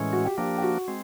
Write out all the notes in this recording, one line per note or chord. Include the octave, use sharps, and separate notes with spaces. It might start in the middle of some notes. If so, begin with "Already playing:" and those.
Already playing: A2 E3 G#3 C#4
F#4
G4
F3 A#3 D4 G4
G4
F#4
G#3 C4